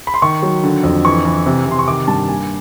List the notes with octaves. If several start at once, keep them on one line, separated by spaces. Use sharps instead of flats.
B5
C6
D#3 C#6
F#3
D3
F2
E3 C#6
E3
C3
C3 C6
C#6
D#3 D6
G2 A5
A#3 G#5